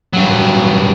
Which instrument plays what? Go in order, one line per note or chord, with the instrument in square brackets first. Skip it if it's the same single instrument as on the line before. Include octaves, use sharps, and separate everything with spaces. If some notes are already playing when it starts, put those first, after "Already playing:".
[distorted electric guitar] G2 F#3